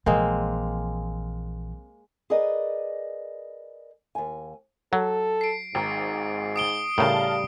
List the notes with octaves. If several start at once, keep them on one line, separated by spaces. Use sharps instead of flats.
A#1 E3 G#3 A#3 C4
G#4 A#4 B4 D5 D#5
D#2 G#5
F#3 A4
C7 D7
G#1 G#2 A#5
D#6 D7 G7
A2 C#3 G3 A#4 F5 A5